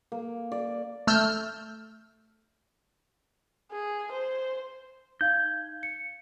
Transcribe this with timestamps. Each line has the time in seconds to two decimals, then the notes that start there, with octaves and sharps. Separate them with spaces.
0.12 A#3
0.52 D5
1.07 A3 E6 F6 G6
3.72 G#4
4.12 C5
5.21 D#4 F5 G6 G#6
5.83 C#7